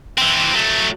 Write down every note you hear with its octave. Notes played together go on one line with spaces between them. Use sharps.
E3 C4
F#3 A3